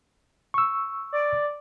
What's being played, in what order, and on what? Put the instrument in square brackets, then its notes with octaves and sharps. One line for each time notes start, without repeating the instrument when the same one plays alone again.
[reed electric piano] C#6 E6
[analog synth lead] D5